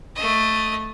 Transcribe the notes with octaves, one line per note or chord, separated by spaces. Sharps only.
A3 D#5